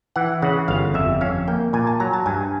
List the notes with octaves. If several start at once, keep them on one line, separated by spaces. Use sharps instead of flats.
E3 F#5
C#3 F#5
G1 F5
F2 E5
C#4 F5
A#3 G5
A#2 G#5
A5
F#3 A#5
A5
G2 G#5